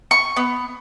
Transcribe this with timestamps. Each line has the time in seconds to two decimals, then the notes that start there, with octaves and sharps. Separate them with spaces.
0.11 C#6
0.36 B3